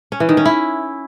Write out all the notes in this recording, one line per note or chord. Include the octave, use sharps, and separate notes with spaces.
C#4
E3
D#3
C#4
E4